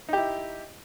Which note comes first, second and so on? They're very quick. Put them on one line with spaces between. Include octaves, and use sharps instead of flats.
D#4 G4 E4